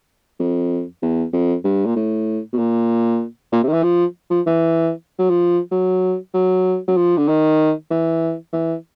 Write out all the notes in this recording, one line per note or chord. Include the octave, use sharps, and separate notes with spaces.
F2
E2
F2
G2
A#2
A2
B2
A#2
A#2
C3
D#3
E3
F3
F3
E3
F#3
F3
F#3
F#3
F#3
F3
D3
D#3
E3
E3